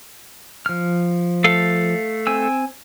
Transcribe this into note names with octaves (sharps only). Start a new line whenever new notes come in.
F3 F6
A3 A4 F5
C4 G#5 E6